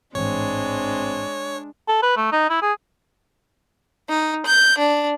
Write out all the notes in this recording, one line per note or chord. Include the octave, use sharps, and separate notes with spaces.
A1 G#2 E3 G#3 C4 D4 C#5
A4
B4
A3
D#4
E4
G#4
D#4
G6
D4